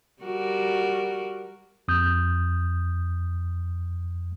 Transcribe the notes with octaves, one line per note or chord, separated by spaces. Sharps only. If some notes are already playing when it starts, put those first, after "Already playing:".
G3 F#4 A#4
F2 D#6 G6